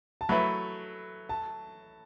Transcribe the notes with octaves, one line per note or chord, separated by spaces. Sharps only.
A5
F#3 A3 E4 B4 B5
A5